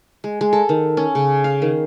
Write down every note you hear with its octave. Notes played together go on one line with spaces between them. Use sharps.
G#3
G#3
A4
D#3
C#4
C#3
F5
D#3